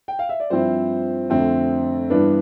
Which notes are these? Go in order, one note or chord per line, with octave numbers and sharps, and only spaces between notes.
G5
F5
E5
D5
G2 F3 C4 E4 C5
F2 D3 A3 C4
G2 E3 B3 D4